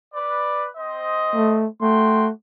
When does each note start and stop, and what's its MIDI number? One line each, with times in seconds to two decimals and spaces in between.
0.14 0.68 71
0.14 0.68 74
0.76 1.65 60
0.76 1.65 72
0.76 1.65 75
1.35 1.67 57
1.82 2.31 57
1.82 2.27 66
1.82 2.27 79
1.82 2.27 84